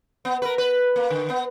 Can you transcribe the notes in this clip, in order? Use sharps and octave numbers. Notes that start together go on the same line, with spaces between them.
B3
A#4 B4
B4
A#3
D3
B3